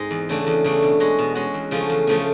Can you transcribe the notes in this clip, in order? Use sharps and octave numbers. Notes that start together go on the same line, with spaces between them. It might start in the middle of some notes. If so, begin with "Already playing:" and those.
Already playing: G#2 G#3 C4
E2
C#3 E3 A3 D4
E2
C#3 E3 A3 D4
B2
G#3 C#4 F#4
B2
G#3 C#4 F#4
E2
C#3 F3 A3 C#4
E2
C#3 F3 A3 C#4